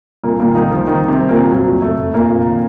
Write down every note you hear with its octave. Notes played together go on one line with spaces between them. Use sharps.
C2 A#2 A#3
A#2 D#3 A#3
C2 D#3 D#4
D#3 F3 F4
C2 D#3 D#4
D#3
C3 C4
C2
A#2 A#3
C2
F2 F#3
F2
F1 A3
F1
F1 A#2 A#3
F2
D#3